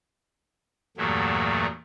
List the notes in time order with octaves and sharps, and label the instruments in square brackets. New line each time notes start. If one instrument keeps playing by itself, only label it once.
[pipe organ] E2 G2 A#2 F#3 A3